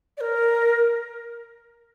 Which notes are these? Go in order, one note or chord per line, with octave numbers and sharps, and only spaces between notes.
D5
A#4